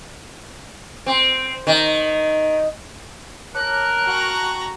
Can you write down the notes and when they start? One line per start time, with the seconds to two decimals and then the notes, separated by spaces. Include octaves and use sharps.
1.06 C4
1.67 D#3
3.55 A#4 C#5 A5 D6 F#6
4.05 F#4 G5 A5 A#5 C#6